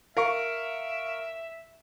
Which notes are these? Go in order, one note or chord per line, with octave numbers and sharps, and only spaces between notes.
A#4 E5 F5 C#6